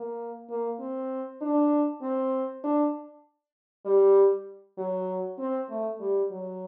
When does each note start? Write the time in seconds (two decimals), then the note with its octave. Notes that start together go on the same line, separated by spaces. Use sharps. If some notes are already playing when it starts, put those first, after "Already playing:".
Already playing: A#3
0.50 A#3
0.79 C4
1.41 D4
2.02 C4
2.64 D4
3.85 G3
4.78 F#3
5.38 C4
5.69 A3
6.00 G3
6.30 F#3